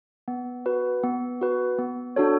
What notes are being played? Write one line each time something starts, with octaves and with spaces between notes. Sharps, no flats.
B3
F#4 B4
B3
F#4 B4
B3
D4 F#4 A4 C#5